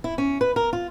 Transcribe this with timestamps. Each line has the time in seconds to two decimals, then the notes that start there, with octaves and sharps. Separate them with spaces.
0.04 E4
0.18 C#4
0.41 B4
0.56 A#4
0.73 F4